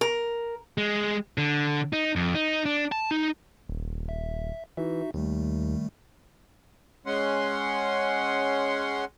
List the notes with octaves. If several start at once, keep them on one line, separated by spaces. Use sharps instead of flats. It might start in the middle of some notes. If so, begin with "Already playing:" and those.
A#4
G#3
D3
D#4
F2
D#4
D4
A5
D#4
D#1
E5
E3 D#4 F#4 E5
D#2 D#3 G3 A3
G#3 C#4 F#5 C6